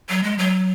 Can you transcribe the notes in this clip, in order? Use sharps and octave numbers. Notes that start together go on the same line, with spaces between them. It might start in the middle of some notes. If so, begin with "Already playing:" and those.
F#3
G#3
F#3